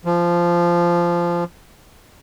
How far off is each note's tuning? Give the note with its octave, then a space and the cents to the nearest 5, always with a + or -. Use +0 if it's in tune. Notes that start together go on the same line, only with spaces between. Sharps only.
F3 -15